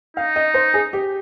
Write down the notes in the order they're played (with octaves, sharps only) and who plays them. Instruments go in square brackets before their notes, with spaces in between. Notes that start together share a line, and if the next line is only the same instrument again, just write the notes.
[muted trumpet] D#4 [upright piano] F5
[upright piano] D#5
C5
G#4
G4